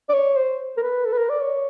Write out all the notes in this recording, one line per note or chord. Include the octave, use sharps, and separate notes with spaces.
D5
C#5
C5
A#4
B4
A4
B4
A#4
D5
C#5